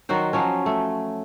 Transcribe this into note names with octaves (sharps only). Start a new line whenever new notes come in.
D#3 F#3 F#4 C5
F3 F#3 C#4
A3